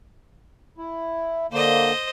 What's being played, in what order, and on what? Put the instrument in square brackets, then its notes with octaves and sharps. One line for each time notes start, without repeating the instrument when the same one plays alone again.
[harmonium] E4
[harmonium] D3 A#3 [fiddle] C5 D#5